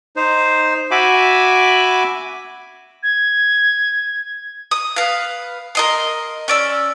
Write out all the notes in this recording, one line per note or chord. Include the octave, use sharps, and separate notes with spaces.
D#4 C5
F#4 E5 G#5 B5 D6
G#6
D#6
B4 F5
A#4 D#5 C6
C#4 D5 E6